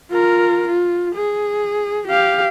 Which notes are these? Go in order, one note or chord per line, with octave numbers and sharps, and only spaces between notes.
F4 A#4
F4
G#4
G4 F5